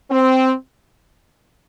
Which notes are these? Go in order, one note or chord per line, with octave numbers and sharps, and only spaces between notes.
C4